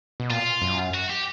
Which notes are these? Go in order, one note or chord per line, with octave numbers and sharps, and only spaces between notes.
B2
A#2 F4
F#2
F#4
G4